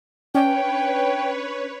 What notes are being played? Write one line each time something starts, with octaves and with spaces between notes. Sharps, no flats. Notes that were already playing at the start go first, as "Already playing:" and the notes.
C#4 D4 B4 C#5 G5